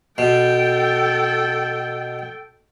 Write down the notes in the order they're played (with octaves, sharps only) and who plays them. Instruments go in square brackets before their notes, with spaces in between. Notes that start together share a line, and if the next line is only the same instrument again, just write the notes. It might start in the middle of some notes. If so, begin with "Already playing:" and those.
[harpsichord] B2 [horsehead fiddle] A4 G5